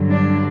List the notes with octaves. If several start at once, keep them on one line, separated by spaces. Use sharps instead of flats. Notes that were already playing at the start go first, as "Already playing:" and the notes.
Already playing: G2 D3 F#3
D4